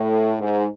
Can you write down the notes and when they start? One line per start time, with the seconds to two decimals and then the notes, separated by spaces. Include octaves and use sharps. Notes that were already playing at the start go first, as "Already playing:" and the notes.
Already playing: A2
0.39 G#2